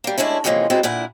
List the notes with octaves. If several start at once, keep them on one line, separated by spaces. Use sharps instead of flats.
G3 A#3
G#3 A3 C#4 D4 E4
C3 E3 F3 G#3 A#3 C#4
F#3 G#3 C4 E4 F4 B4
A#2 D3 E4 A#4 F#5